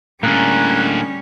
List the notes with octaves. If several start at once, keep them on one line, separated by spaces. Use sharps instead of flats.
A2 D3 G3 A#3 C#4 G#4 A#4 F#6